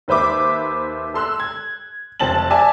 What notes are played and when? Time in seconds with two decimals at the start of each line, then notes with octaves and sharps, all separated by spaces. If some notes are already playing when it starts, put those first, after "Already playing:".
0.08 D#2 B4 C5 E5 D6
1.14 A4 C6 E6 F#6
1.40 G#6
2.20 F1 C4 A5 A6 F#7
2.50 D5 E5 G#5 A5